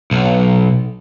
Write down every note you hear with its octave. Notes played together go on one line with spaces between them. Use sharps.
B1